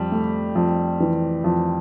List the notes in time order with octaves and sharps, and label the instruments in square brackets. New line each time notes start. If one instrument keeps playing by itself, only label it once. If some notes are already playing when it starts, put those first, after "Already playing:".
Already playing: [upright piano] F2 [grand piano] G3
[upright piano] A3
F2
E3
F2